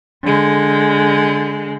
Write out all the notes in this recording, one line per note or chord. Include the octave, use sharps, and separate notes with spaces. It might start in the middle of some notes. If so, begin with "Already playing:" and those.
D3 G#3